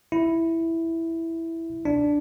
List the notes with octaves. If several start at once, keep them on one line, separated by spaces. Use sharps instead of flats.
E4
D4